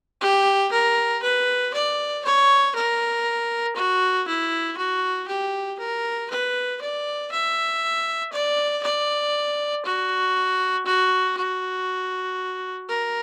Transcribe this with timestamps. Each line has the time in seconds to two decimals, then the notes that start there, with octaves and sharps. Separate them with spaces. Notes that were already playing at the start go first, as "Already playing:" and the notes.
0.21 G4
0.72 A#4
1.23 B4
1.74 D5
2.25 C#5
2.75 A#4
3.76 F#4
4.27 E4
4.78 F#4
5.28 G4
5.79 A#4
6.30 B4
6.81 D5
7.32 E5
8.33 D5
8.83 D5
9.85 F#4
10.86 F#4
11.37 F#4
12.89 A#4